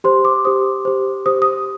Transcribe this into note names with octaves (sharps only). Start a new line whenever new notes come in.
G4 C5 C6
D6
G4 C5 D#6
G4 C5
G4 C5 D#6
D#6